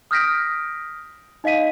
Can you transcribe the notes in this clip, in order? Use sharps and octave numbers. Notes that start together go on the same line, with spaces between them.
D#6 F6 G6 A#6 B6 D7
D#4 D#5 F5 B6 D#7